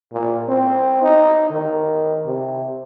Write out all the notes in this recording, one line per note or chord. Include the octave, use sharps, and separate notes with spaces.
A#2
C4
D#4
D#3
C3